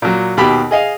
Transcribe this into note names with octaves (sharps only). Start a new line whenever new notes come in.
A#2 F#3
D#2 B2 G4 B5
G#4 D#5 F5